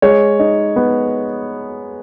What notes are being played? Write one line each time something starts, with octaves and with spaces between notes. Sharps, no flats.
G#3 C#5
D#4
B3